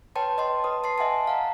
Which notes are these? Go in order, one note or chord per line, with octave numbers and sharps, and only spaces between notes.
B4 C#5 G5 A5 C6
D#5 A5 C6
B4 A5 D#6
A5 C6 C7
D#5 E5 F#5 G#5 A5
F5 F#5 A#5